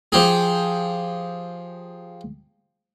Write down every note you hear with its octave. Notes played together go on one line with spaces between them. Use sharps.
F3 G4 G#4